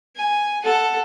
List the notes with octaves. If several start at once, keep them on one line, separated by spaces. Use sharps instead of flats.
G#5
A4 F#5